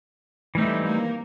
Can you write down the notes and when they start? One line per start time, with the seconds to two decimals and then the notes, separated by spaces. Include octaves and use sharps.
0.55 E3 G3 A3 C4 D#4
0.86 A#3